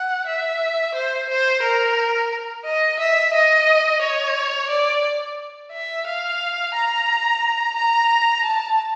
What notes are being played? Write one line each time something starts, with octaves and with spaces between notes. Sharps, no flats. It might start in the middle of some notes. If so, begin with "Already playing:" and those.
Already playing: F#5
E5
C5
C5
A#4
D#5
E5
D#5
C#5
D5
E5
F5
A#5
A#5
A5